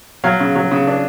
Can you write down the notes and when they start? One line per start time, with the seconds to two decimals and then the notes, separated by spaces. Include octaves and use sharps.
0.24 F#3 F5
0.40 C#3
0.55 F#3
0.71 C#3
0.87 D4